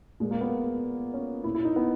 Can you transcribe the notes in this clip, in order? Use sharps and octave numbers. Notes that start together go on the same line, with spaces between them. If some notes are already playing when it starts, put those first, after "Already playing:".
A#2 G#3
A#3
B3
C#4
A#2 E4
E4
D#4
B3